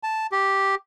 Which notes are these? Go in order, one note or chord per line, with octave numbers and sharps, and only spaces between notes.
A5
G4